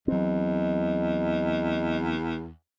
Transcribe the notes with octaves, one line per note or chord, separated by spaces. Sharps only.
E2 F#3 C4 D#5